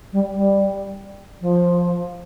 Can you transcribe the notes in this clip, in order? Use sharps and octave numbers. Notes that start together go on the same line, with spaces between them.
G3
G3
F3